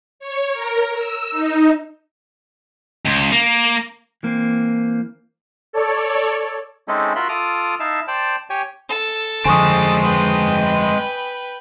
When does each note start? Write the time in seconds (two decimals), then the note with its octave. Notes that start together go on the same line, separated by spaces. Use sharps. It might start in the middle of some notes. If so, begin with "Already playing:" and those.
0.20 C#5
0.53 A#4
0.94 E6
1.31 D#4
3.05 C#2
3.32 A#3
4.23 E3 A#3 C4
5.73 A4 C#5 D5
6.88 G#3 C4 C#4 D#4 E4 A4
7.16 F4 F#4 A#4 E5 B5 C6
7.29 F4 A4 D6 D#6 F6
7.80 D#4 E4 E5 F5 A5
8.08 C5 D5 G5 A5
8.50 G4 C#5 G5 G#5
8.89 A4
9.45 F2 D3 G#3 C4 G#5 C#6 D#6
10.02 B4 G5